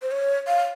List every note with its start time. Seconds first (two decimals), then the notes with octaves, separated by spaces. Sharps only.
0.02 C5
0.11 C#5
0.47 F5